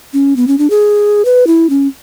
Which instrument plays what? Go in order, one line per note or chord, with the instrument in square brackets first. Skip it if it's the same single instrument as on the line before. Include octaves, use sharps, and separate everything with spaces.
[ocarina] C#4
B3
C#4
D4
G#4
B4
E4
C#4